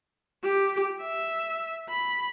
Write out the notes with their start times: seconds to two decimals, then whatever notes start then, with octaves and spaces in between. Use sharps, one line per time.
0.43 G4
1.01 E5
1.89 B5